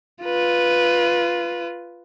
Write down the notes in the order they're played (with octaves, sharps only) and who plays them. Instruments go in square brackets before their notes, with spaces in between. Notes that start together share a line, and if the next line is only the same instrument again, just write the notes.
[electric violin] F4 B4